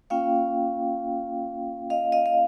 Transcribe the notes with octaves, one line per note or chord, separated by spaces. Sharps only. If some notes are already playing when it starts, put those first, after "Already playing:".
A#3 C#4 F4 F5 G5
D#5 F5
D#5 F5
F5